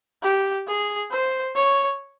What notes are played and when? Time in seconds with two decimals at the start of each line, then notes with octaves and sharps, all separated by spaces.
0.23 G4
0.68 G#4
1.11 C5
1.55 C#5